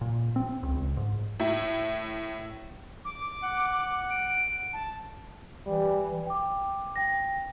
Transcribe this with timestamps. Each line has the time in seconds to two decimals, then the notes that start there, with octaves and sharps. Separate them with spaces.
0.01 A#2
0.36 C4
0.63 C#2
0.77 C#2
0.97 G#2
1.40 A2 E4
3.05 D6
3.43 F#5
4.10 D7
4.73 A5
5.67 E3 G3
6.26 G5 D6
6.96 G5 A#6